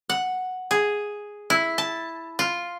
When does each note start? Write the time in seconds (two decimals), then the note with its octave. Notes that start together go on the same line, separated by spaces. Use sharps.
0.10 F#5
0.71 G#4
1.50 E4
1.78 A5
2.39 F4